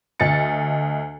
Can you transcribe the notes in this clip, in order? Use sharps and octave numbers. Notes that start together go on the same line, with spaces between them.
D2 D#5 A6 C#7